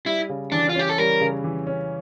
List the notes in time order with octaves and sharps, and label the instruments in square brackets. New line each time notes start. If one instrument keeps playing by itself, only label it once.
[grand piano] G3 [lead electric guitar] E4
[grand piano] C#3
[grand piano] E3 [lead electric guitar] D4
[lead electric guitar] F4
[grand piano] C#4 [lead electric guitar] G4
[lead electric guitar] A4
[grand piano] G3 [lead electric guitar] A#4
[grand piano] C#3
E3
C#4